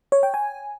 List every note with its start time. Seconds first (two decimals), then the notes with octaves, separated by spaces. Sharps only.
0.12 C#5
0.23 G5
0.34 G#5